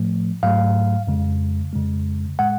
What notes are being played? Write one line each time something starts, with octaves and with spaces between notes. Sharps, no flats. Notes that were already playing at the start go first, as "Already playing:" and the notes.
Already playing: A2 F3 A3
G#2 F#3 A3 F5
F2 C#3 G#3
F2 C#3 G#3
A2 G#3 F#5